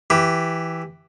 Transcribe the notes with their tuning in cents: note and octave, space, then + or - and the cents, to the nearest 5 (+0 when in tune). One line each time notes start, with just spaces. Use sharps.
E3 +0 G4 +0